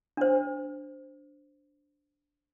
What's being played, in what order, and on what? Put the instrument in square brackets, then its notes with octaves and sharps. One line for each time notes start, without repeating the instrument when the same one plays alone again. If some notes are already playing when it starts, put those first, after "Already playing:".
[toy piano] D4 C5